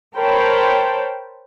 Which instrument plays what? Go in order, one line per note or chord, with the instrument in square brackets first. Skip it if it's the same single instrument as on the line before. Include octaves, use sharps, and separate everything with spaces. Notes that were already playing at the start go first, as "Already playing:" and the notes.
[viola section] A#4 C5 C#5 G5 A5 B5